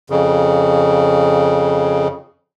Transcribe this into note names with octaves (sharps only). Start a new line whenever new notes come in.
F2 C#3